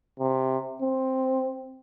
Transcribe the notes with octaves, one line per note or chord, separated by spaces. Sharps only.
C3
C4